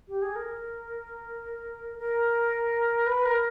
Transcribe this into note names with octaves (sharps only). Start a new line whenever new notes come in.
G4
G#4
A#4
A#4
B4
A#4